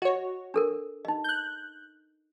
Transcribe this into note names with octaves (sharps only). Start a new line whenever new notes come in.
F#4 C#5 D#5
D4 A4 A#4
D#4 D#5
F#6 G6